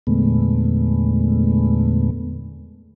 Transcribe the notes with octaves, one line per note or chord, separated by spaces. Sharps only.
E2 A#2 D3 G#3 A3 B3